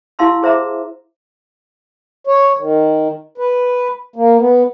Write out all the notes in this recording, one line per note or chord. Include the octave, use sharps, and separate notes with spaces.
E4 G4 F5 A5 C6 E6
G#4 C5 E5 A#5 D6
C#5
D#3
B4
A#3
B3